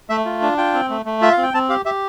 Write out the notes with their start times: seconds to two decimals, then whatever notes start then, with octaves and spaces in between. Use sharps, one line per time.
0.09 A3 E5
0.25 F4
0.42 D4
0.58 F4 G5
0.74 C4
0.90 A3
1.06 A3
1.22 F4 E5
1.32 C4 F5
1.43 G5
1.54 C4 A5
1.69 G4 F5
1.85 G4 E5